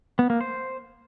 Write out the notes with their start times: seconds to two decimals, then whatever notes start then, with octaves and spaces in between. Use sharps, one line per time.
0.19 B3
0.30 A#3
0.41 C5